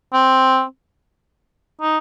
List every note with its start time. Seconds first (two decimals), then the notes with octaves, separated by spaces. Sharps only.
0.13 C4
1.81 D#4